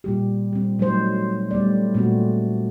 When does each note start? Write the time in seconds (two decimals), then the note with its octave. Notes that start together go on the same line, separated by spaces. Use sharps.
0.04 A#2 G3 G4
0.53 G3 C4
0.79 F#3 A3 D#4 C5
1.51 G3 A3 B3 D5
1.94 A#2 A3 C4 F#4